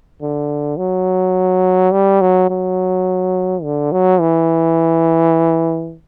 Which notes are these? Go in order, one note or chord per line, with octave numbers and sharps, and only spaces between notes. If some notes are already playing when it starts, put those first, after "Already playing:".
D3
F#3
G3
F#3
F#3
D3
F#3
E3